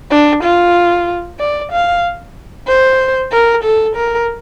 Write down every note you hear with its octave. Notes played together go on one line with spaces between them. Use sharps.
D4
F4
D5
F5
C5
A#4
A4
A#4